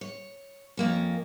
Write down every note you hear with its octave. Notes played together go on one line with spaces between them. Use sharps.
C#5
F2 A#3 C#4